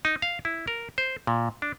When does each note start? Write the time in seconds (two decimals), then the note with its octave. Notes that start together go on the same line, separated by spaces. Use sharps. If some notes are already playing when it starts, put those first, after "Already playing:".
0.05 D#4
0.22 F5
0.45 E4
0.68 A#4
0.98 C5
1.27 A#2
1.62 D4